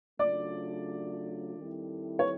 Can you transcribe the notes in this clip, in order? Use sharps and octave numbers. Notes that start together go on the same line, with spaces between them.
C#3 F#3 A3 D4 F4 D5
D#3 G3 C4 E4 A4
C#5